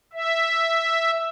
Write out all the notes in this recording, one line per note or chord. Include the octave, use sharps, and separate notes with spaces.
E5